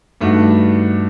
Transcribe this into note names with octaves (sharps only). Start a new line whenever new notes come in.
G2 D#3 A3 D4 F#4